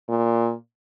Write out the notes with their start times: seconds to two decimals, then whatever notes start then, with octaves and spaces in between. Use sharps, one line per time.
0.09 A#2